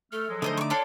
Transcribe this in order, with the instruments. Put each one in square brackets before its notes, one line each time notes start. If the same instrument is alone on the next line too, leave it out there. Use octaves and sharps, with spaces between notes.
[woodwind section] A3 F6 [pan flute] A4
[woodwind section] F3 F#3 G#3
[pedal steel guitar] D3 A3 D#4 [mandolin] C5 D5 D#5
[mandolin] C#6 D6
[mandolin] D4 A4 F5 [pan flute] C#5 [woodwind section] D5 C6